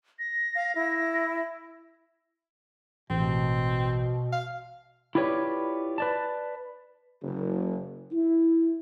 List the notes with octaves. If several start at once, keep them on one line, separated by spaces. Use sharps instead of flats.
A#6
F5
E4
A1 B2 C4
F5
E4 F4 G4 B4 C#5 D5
B4 D5 A5
F#1
E4